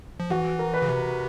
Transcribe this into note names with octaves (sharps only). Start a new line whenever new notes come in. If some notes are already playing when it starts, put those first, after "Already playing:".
F3
E3 F#4
A#4
B4
C#3
C3